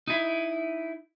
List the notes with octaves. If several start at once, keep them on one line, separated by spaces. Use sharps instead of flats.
D#4 E4